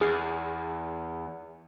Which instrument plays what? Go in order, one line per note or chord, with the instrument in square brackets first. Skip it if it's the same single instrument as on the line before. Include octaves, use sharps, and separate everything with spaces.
[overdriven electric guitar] E2 [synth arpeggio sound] G#4 F6 C7